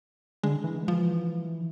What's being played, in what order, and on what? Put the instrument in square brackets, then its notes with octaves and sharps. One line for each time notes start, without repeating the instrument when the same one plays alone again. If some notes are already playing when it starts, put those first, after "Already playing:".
[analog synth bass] D3 [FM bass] G#3
[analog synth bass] E3
[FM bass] F3